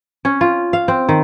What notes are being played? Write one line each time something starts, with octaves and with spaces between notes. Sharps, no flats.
C#4
F4
F5
C4
D#3